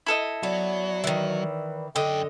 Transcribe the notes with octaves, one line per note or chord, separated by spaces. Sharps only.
E4 A4 D#5
F#3 B3 D5
D#3 E3
F#2 D3 A4 D#5 G5